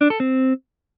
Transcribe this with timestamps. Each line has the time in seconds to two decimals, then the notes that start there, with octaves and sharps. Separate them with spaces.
0.01 D4
0.10 A4
0.20 C4